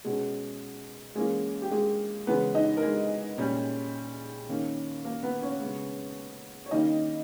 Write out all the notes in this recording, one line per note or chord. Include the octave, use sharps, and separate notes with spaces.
B2 G#3 C#4 G#4
E3 G#3 A#3 C#4 G#4
G4
G#3 G#4
C#3 E3 G#3 B3 C#4 B4
D#4 D#5
A#4
G#3 G#4
A#2 G3 C#4
D#3 A#3 C#4
A#3 A#4
B3 B4
C#4 C#5
C#3 G#3 B3
C#5
D#3 G3 A#3 C#4 D#4 D#5